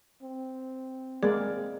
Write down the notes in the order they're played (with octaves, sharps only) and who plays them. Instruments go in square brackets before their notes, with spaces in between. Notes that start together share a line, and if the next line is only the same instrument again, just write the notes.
[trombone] C4
[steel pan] G#3 A#3 D5 [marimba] G#4